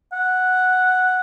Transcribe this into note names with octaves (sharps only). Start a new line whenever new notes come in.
F#5